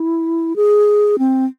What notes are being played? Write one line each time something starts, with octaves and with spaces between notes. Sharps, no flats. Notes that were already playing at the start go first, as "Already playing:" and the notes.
Already playing: E4
G#4
C4